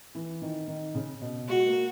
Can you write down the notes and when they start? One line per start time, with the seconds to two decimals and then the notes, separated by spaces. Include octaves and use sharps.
0.15 E3
0.42 D#3
0.68 D#3
0.95 C#3
1.21 B2
1.48 G#3 F#4
1.66 A#3